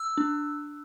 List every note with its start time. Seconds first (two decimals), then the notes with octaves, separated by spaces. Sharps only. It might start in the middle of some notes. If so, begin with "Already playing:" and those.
Already playing: E6
0.17 D4